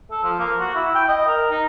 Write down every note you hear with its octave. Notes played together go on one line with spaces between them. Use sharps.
A4
F3
A#3
F#4
E4
G5
D#5
A#4
D#4